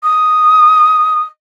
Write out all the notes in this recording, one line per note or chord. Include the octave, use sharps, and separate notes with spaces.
D#6